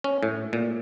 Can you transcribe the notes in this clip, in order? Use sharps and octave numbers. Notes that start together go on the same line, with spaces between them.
C#4
A2
A#2